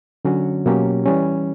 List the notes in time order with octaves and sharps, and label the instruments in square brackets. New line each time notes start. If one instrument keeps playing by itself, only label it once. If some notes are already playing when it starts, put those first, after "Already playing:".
[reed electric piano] D3 F#3 C#4 F#4
B2 F#3 A#3 C#4 G4
E3 G3 C#4